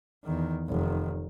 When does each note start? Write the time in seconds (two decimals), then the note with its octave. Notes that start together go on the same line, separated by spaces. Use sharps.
0.24 E2 D#3
0.69 F1 D#3